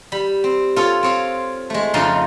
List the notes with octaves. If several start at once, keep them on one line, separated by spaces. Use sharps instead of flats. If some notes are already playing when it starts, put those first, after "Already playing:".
G3 B5
C4
F4 A4 C#5
C4 C#5 F5
G#3 A3
F2 C#3 D#4 F4 A5 C6